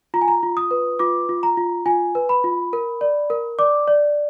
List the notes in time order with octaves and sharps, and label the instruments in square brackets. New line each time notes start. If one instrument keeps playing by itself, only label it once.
[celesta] F4 A#5
G#5
A#5
F4
D#6
B4
F4 D6
F4
A#5
F4
F4 G#5
B4
B5
F4
A#4
D5
A#4
D5 D6
D5